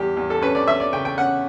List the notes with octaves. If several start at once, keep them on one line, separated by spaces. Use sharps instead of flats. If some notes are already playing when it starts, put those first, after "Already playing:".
Already playing: E2 G3 G4
E2
A4
C#4 B4
D5
C#4 E5
D5
C#3 G5
G5
C#4 F#5